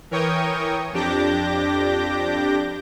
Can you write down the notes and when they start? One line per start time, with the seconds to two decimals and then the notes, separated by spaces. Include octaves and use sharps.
0.11 E3 A#4 C#5 G5 C#6 D#6
0.93 F2 D4 G4 D6 G6 A#6